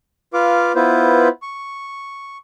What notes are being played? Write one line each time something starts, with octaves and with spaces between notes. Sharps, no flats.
F4 B4 F5 D6
B3 E4 F4 B4 C5
C#6